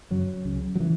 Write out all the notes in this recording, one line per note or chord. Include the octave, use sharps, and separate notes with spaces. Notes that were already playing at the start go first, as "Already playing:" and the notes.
F#2 C#3 F#3
C#2 C#3
F#3
C#3 E3